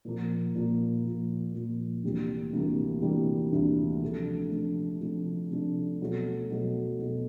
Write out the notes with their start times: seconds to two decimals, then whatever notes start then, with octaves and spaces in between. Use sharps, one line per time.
0.05 A#2 F3 A#3
0.55 A#2 F3 A#3
1.04 A#2 F3 A#3
1.53 A#2 F3 A#3
2.03 D2 C3 E3 G3 A#3
2.53 D2 C3 E3 G3 A#3
3.02 D2 C3 E3 G3 A#3
3.52 D2 C3 E3 G3 A#3
4.01 C3 F3 A3 D4
4.51 C3 F3 A3 D4
5.01 C3 F3 A3 D4
5.50 C3 F3 A3 D4
6.00 B2 F#3 A3
6.50 B2 F#3 A3
6.99 B2 F#3 A3